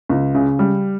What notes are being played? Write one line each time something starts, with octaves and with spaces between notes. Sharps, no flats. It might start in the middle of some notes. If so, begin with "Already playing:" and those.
C#2
C#3
G3